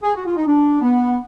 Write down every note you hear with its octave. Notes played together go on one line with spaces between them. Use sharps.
G#4
F#4
F4
D#4
D4
B3